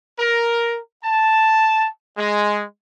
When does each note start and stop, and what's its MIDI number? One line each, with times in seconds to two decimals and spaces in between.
0.19 0.78 70
1.04 1.87 81
2.17 2.62 56